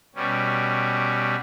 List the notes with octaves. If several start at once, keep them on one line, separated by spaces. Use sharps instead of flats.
B2 G3 C#4